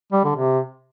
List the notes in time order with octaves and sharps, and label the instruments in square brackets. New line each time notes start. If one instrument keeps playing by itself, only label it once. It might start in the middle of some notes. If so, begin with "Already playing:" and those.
[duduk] G3
D3
C3